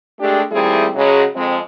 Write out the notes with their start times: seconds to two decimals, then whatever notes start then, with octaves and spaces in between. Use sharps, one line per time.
0.20 G#3 A3 D4 G4
0.52 D#2 G3 A3 C4 E4 G#4
0.96 C#3 F#3 G#3
1.36 F2 G#3 C4